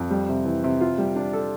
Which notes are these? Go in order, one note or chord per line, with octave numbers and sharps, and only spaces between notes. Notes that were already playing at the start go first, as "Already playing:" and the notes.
Already playing: F2
G3
C3
E3
C3
F4
G3
D4
A4